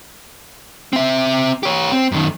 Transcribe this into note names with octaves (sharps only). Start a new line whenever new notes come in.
C4 E5
G4 C#5
C4
F#2 D#3